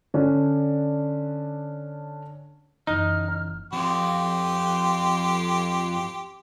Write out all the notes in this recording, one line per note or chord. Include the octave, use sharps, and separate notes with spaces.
D3 C#4 D4
F#1 E3 D#4 F6
F2 G4 C6